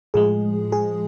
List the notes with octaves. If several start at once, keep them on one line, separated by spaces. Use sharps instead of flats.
A2 F3 G#3 G#4
G#4